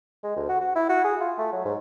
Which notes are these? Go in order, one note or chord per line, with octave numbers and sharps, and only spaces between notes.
G#3
D2
F#4
F#4
E4
F#4
G#4
F4
A3
F#3
G#2